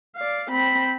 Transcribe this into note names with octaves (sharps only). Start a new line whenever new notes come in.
D5 F5
C4 B5